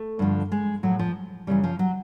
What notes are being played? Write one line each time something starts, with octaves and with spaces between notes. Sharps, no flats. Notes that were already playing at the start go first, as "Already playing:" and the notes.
Already playing: A3
G2 D3 F3
G#3
A2 F3 F#3
F3
F#2 C#3 E3 G3
F3
F#3